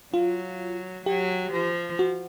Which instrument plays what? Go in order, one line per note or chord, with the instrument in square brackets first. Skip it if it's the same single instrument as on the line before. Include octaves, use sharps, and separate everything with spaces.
[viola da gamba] F#3 [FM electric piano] F4
[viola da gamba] F#3 [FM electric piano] G4
[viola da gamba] F3
[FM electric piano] F#4